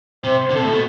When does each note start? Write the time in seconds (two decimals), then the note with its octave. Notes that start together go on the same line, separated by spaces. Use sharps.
0.24 C3 C5
0.50 D3
0.55 C3 A4
0.64 A2
0.71 B2